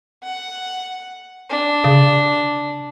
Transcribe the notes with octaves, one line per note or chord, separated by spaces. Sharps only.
F#5
D4
C#3